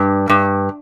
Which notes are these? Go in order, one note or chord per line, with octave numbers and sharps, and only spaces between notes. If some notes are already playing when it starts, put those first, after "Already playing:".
Already playing: G2
G2